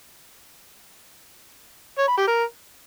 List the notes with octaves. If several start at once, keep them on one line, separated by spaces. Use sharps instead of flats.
C#5
B5
G4
A#4